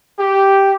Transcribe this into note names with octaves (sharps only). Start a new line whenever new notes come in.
G4